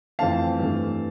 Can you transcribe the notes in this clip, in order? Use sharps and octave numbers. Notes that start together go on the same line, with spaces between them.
F2 E3 A3 C4 F5 A5
G2 E3 A3